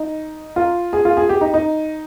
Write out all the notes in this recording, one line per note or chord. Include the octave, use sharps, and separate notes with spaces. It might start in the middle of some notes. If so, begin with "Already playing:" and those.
Already playing: D#4
F4
G#4
F4
G#4
G4
D#4
D#4